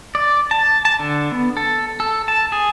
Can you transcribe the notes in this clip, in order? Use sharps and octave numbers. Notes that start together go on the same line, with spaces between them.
D5
A5
A5
D3
B3
A4
A4
A5
G#4